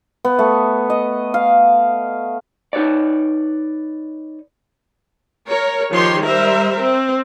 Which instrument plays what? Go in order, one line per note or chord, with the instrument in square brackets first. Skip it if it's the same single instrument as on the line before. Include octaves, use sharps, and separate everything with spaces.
[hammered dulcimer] B3
A3
D#5
F5
[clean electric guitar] D#4 F#4 B4 C#5 D5
[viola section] A#4 C#5
D#3 F3 G4 C#5 C6
G3 A#4 C5 E5
C4